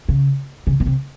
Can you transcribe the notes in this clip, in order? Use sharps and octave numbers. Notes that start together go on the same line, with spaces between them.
C#3
C#3
B2
C3